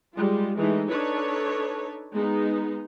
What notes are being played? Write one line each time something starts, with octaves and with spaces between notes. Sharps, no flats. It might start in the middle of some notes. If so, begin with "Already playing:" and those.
G3 G#3 F4
E3 G#3 A3 D#4
D4 D#4 A4 B4 C#5
G#3 B3 D#4